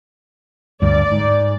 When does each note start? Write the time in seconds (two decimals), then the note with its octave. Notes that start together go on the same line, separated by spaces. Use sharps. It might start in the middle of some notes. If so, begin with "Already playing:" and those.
0.82 D2 G2 D5
1.12 G#2